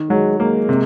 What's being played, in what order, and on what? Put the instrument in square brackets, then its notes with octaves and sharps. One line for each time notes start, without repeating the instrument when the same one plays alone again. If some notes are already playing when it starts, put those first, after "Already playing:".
Already playing: [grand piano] D#3
[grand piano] F#3 [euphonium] G#3
[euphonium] G#3 [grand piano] A#3
[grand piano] C3